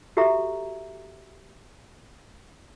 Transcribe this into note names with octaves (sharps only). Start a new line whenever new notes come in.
F#4 G4 A4 E5 A#5